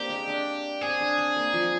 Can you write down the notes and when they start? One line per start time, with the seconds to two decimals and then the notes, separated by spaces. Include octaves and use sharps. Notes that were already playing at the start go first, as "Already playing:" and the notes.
Already playing: A#3 C4 D4 G4
0.10 G#3
0.28 D4
0.81 C4 G#4
1.00 D4
1.18 C4
1.36 A#3
1.54 F3